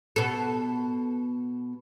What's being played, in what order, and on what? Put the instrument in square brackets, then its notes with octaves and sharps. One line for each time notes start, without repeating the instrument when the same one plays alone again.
[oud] B2 A4